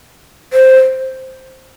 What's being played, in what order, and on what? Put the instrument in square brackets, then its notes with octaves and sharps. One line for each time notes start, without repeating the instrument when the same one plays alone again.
[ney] C5